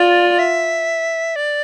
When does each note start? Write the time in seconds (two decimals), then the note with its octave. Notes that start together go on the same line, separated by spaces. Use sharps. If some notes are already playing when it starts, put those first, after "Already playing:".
Already playing: F4 D5
0.39 E5
1.36 D5